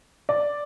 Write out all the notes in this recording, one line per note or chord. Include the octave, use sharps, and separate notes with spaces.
D5